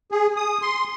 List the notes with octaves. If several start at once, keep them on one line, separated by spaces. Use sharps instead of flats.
G#4
D#6
C6